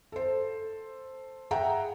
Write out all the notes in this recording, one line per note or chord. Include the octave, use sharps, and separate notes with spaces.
A4 C5
G#4 E5 F#5 G5 A#5